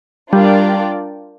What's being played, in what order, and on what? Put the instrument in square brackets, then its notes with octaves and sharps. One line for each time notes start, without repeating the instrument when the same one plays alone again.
[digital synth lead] G3 [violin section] D4 F4 A#4 D5 G5